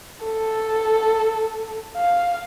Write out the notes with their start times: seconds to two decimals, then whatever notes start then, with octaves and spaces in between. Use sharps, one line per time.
0.24 A4
1.97 F5